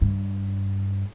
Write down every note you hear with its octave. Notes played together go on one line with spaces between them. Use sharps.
G2